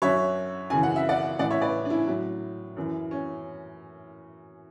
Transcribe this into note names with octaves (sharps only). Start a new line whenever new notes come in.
F#2 D3 F#3 C#5 E5
F#2 C#3 E3 G#5
F#5
E5
D5 F#5
A2 E3 D5 F#5
C#5 E5
B4 D5
D4
C#4 E4
A2 F#3
F#2 E3
C#4